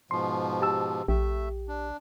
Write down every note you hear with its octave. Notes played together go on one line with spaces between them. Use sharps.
G#2 B2 F3 C6
G4 A5 E6
A#1 A3 G4 E5
D4